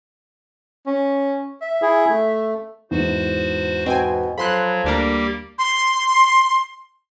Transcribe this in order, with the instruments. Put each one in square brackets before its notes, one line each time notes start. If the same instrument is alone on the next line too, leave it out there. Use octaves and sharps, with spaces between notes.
[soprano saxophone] C#4
E5
[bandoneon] E4 G#4
A3
[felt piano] E2 G#2 [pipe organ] F#4 C5
[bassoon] B2 [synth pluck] C4 G5 G#5
[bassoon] F3 [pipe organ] F#3 [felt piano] A4 [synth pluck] B5 C6 F#6
[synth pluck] D2 D4 A#4 [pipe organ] G3 A#3 G4
[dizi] C6